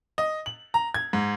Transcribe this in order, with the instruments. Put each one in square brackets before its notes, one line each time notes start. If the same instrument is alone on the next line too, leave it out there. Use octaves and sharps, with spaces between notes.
[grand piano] D#5
F#7
A#5
G#6
G#2